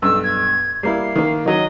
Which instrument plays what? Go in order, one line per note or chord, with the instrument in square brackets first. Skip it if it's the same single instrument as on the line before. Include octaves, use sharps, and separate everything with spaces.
[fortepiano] B1 G2 [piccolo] E6
[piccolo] G#6
[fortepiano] G3 A#3 E4 [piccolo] C7
[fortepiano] D#3 A#3
[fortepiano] D#3 F#3 [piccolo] D#5